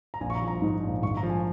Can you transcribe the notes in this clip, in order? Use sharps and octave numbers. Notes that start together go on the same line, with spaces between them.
A#5
A#1 G#5
C#6
A#5
F3
A#5
G#2
A#1
G#1 C#6
A#5
F3
G#5